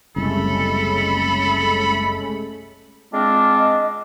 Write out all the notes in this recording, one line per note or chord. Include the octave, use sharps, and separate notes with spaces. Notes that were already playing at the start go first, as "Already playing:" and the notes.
F#1 C2 G#3 A3 C#4 A4 B5
G#3 C4 D4 F4
D#5